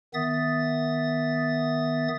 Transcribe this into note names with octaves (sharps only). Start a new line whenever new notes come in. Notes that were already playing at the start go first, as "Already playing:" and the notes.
D#3 B3 E5 D#6 A6